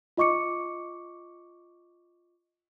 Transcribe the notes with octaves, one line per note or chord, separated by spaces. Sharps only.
F4 D#5 C#6 D6 C#7